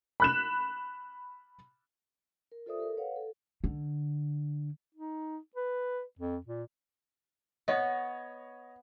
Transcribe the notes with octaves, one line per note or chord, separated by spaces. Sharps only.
B5 F#6 E7
A#4
F4 A4 C5 D5 E5 D#6
G4 A4 A#4
B4 C#5 F5 F#5
A4
D3
D#4
B4
F2
A#2
B3 C#5 D#5